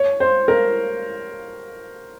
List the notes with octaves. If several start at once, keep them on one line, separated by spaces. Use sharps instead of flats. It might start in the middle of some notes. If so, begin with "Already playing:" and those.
Already playing: C#5
C5
A#4